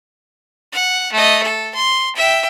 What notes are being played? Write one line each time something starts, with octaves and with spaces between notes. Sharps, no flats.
F#5
A3 D#5
A4
C6
E5 G5